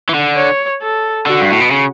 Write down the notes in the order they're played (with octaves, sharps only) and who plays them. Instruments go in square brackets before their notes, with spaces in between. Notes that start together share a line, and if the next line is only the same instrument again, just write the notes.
[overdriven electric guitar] E3
D3
[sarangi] C#5
A4
[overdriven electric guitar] D3 [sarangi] F#4
[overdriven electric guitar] G2
A2
B2
C#3